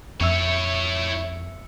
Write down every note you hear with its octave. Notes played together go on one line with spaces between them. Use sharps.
F2 E4 C#5 E5 E6 C#7